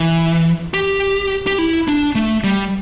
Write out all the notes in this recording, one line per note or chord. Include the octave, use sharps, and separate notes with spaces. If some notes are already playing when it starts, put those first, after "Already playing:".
Already playing: E3
G4
G4
E4
D4
A3
G3